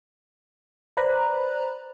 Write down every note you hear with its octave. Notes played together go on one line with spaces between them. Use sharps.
B4 C5 D5 A#5 B5 F#6